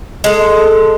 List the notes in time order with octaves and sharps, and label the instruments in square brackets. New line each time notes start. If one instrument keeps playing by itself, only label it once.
[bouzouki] G#3 A4